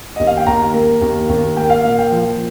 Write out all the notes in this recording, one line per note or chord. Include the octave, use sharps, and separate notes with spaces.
D#2 D#5
F5
G5
D#2 A#5
A#3
D#2
D#2
A#3 G5
F5
A#2 F5
G5
F3